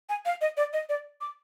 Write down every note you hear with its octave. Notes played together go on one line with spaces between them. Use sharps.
G#5
F5
D#5
D5
D#5
D5
D6